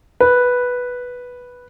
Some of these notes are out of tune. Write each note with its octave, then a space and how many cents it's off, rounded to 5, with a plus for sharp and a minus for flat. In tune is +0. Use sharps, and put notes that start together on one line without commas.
B4 -5